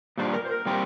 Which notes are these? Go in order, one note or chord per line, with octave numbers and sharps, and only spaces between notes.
A#2 G3 D4 C5
A#4
C5
A#4
A#2 G3 C4 G4